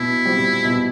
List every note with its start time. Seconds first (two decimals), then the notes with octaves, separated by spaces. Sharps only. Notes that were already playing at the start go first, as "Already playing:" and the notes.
Already playing: B2 E4
0.25 G3 C4 F4
0.64 B2